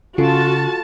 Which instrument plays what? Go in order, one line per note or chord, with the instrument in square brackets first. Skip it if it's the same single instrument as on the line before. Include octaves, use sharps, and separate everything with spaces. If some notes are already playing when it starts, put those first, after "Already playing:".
[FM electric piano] C#3 [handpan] F4 A4 [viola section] F#4 A5